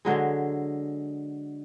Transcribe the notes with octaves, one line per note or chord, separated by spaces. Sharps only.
D3 F#3 G#3